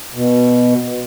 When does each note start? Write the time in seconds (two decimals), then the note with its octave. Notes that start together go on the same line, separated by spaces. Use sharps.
0.13 B2